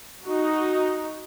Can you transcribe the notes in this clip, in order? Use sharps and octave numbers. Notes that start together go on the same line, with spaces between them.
D#4 F#4